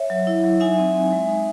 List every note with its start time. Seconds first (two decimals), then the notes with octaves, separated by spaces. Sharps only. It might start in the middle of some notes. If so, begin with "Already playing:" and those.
Already playing: C#5 E5
0.10 F#3
0.27 E4
0.44 F#3
0.60 D#4 E5 G#5
0.78 C4
0.95 C4
1.12 G#3
1.28 D#4